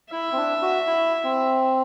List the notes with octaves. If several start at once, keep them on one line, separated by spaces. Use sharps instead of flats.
E4 E5
C4
D4
F#4
E4
C4